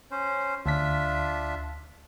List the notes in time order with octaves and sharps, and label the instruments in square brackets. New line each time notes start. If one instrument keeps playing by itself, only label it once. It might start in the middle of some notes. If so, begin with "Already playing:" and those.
[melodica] C#4 C5
[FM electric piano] D2 B6 [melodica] D4 F4 E5